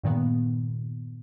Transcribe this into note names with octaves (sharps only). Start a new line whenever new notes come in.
G2 A#2 D#3 B3